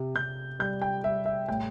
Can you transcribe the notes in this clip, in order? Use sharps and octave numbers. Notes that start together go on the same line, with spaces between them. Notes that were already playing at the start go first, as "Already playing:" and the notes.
Already playing: C3
C3 G6
G3 G6
G5
G3 E5
E5
A2 G5